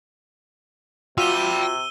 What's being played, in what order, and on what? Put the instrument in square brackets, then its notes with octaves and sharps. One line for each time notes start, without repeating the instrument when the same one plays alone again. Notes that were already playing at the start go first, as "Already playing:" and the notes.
[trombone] C3 [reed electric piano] F4 F#4 [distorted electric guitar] G5 B5 [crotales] E6 D#7 G7